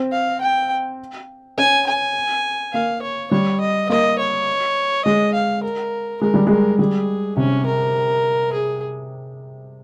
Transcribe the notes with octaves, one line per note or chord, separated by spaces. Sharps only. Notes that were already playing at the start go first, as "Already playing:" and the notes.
Already playing: C4
F5
G5
C#4 G#5
G#5
A#3 F5
C#5
G3 C#5
D#5
A#3 D#5
C#5
G#3 D#5
F5
A#4
G#3 A#4
G3
G#3 A#4
G3 G#4
C3 C#4
A#4
G#4